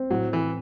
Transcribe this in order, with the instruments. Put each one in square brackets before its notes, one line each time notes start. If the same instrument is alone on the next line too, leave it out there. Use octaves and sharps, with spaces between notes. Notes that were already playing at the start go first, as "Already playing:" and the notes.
Already playing: [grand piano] C4
[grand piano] A2 [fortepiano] F#3
[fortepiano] E3 [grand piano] C4